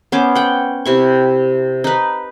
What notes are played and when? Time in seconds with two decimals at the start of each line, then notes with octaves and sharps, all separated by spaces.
0.12 B3 C#4 C5 D6
0.35 F#5 G5
0.85 C3 E4 C#6
1.84 D#4 B4